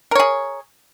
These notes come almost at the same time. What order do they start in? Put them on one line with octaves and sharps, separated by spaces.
A#4 C#5 G#4